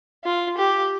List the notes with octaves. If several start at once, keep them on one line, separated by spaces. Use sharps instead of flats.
F4
G4